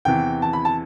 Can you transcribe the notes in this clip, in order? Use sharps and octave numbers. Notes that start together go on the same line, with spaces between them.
E2 C3 E3 G5
A5
B5
A5